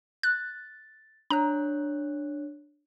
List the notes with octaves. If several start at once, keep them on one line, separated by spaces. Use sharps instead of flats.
F#6 A6
D4 C#5 A#5 F#6